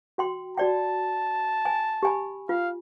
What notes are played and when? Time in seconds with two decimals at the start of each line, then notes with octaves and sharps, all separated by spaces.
0.18 F#4 G5 C6
0.58 F#4 D5 G5 A5
1.65 G#5
2.03 G4 G#5 B5
2.49 F4 F5